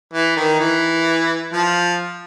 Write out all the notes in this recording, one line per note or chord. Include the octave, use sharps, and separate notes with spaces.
E3
D#3
E3
F3